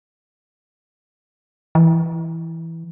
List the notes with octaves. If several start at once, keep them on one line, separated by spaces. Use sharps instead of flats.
E3